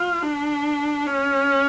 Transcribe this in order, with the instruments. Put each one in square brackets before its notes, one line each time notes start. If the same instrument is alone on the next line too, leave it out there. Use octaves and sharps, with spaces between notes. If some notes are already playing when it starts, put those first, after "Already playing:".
Already playing: [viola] F4
D4
C#4